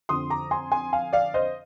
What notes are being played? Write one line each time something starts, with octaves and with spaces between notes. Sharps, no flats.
F2 D3 F3 C6 D#6
A#5 D6
G#5 C6
G#5 C6
F5 G#5
D5 F5
C5 D#5